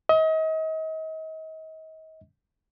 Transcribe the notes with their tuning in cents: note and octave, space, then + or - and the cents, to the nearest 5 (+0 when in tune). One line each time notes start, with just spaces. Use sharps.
D#5 +35